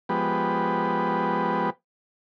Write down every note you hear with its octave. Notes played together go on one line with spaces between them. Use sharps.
F3 G#3 B3 G4 B4